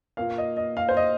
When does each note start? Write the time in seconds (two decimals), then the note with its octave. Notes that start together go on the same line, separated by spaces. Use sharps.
0.17 A#2 A#3 F5
0.38 D#5
0.57 D#5
0.77 F5
0.89 C5
0.97 D#5